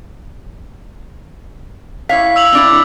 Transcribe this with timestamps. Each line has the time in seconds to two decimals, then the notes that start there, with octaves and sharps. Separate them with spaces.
2.09 E4 C#5 F5 B6
2.36 E6 F7 F#7
2.53 C4 D4 E4